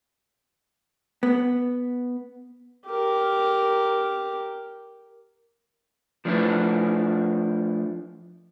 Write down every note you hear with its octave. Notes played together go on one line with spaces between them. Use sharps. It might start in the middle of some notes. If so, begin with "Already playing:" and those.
B3
G4 A#4
F3 A3 D4 E4 B4